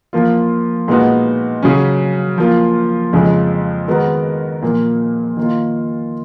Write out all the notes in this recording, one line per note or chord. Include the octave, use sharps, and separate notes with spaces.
F3 A#3 F4
A#2 G#3 B3 D#4 F#4
C#3 F#3 C#4
F3 A#3 F4
F2 C#3 F3 G#3
D#3 G#3 B3 F#4 A#4
A#2 F3 A#3
D#3 A#3 F4